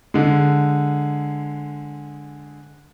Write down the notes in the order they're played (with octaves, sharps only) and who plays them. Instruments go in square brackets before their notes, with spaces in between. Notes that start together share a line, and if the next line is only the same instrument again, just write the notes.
[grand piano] D3 G#3